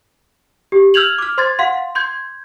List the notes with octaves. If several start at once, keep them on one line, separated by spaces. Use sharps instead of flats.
G4
E6 F6 G6 G#6 F7 F#7
D6 F6
C5 C6 G#6 A6
F5 F#5 C6
C6 G6 G#6